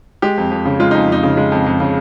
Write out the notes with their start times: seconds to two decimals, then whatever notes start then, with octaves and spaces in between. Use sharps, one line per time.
0.22 G#3 G4
0.37 F2
0.51 F2
0.65 C#3
0.80 G#3 F4
0.91 F2 D#4
1.08 F2 D#4
1.23 C#3
1.37 G#3
1.52 F2
1.66 F2
1.80 C#3